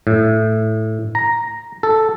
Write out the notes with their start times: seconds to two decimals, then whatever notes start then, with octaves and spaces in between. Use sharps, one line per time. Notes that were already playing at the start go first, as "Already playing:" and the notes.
0.07 A2
1.15 A#5
1.83 A4